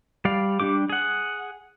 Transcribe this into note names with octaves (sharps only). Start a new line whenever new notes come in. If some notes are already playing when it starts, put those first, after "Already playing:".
G3 D5 F5
G3 C#4 D4 G4 D6
G#4 F#5